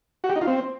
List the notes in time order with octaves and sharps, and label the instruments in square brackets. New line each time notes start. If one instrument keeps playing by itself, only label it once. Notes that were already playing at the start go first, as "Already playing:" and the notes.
[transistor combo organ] F#4
G4
D#4
F4
C4